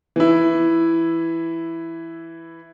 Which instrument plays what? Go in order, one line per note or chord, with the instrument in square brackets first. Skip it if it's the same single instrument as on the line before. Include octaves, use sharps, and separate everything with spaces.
[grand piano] E3 E4